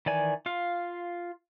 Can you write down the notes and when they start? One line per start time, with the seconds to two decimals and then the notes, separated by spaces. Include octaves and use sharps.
0.06 D#3 E3 D5 G#5
0.46 F4 F5